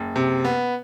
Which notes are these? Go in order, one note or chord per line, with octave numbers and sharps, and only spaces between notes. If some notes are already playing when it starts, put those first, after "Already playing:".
Already playing: F#1
C3
B3